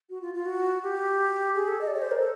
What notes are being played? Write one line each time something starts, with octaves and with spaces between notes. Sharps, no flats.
F#4
F4
F4
F#4
G4
G#4
A4
D#5
D5
C#5
C5
A#4
A4